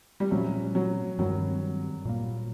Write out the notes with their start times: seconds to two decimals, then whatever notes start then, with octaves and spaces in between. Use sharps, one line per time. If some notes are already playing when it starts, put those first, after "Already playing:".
0.20 G3
0.31 A#2 F3 F#3 A3 C#4
0.75 F#3
1.19 G2 D#3 F#3 G3 C4
2.05 A#2 G3 A#3